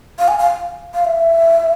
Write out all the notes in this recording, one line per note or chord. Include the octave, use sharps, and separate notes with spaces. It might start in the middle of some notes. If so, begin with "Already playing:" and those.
F5
G#5
F5
F5
E5